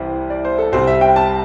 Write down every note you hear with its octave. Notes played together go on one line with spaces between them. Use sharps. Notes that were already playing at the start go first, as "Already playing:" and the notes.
Already playing: C2 C3 E3 G3 C5
D5
C5
A4
C2 C3 G3 C4 C5
E5
G5
A5